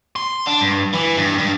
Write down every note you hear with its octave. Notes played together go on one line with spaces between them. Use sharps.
C6
D4
G2
E3
G2
G2